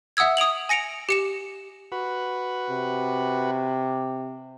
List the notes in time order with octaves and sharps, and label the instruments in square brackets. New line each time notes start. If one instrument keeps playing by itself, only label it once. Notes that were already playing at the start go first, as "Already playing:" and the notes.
[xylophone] E5 F#5 D#6 E6 G#6
D#6 D7 F7 F#7
G#5 A#6 C#7 D7 F7
G4 C#7 E7
[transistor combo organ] F#4 B4
[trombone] C3